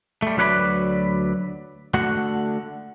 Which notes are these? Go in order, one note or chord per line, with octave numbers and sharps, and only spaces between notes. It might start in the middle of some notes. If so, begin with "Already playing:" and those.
G3 A3
D2 F#3 B4 C#5 D5 B5
D3 A3 F#4 F#5